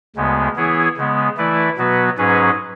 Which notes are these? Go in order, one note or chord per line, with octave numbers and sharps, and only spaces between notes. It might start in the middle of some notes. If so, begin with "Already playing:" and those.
D2 C#3 G#3 B3
E3 B3 E4 G#4 C#5
C#3 G#3 B3
E3 A3 E4 B4 D5
B2 F#3 B3 F#4 B4
G#2 F#3 C#4 G#4 B4